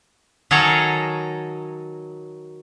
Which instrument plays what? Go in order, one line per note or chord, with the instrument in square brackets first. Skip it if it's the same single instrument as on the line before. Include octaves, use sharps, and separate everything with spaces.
[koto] D#3 F#3 G#4 A4 C#5 A#5